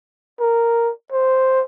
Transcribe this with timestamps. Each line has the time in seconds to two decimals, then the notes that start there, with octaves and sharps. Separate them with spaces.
0.40 A#4
1.12 C5